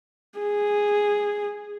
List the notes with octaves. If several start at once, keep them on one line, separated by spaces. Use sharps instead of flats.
G#4